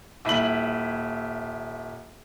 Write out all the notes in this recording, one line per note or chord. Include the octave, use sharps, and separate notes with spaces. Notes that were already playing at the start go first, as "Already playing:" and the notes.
D#1 E4 B6 F#7